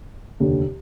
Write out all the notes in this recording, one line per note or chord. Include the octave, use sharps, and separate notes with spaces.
F1 D#2 D3